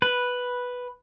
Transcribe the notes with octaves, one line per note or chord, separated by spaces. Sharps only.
B4